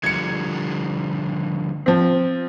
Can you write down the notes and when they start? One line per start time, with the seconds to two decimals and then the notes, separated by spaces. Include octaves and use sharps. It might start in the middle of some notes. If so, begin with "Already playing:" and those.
0.03 D3 F3 G3 G#6 C#7
1.86 F3 C4